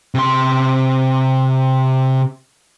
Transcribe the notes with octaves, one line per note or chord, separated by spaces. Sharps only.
C3 C6